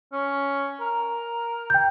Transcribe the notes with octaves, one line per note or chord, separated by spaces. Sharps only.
C#4
A#4
G5 G6